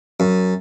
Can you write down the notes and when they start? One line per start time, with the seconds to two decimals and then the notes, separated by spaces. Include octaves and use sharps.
0.20 F#2